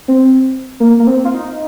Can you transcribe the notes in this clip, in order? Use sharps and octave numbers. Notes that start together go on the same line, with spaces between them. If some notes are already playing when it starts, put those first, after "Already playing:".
C4
A#3
A#3
C4
F4
D#4